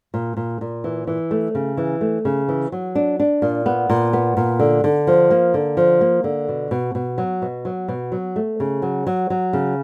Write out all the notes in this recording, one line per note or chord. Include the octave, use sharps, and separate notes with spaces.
A#2
A#2
A#2
E3
E3
A3
C#3
E3
A3
C#3
E3
F#3
D4
D4
A#2
B3
A#2
B3
A#2
D3
D3
F3
A#3
D3
F3
A#3
D3
B2
B2
B2
F#3
B2
F#3
B2
F#3
A3
C#3
F#3
F#3
F#3
C#3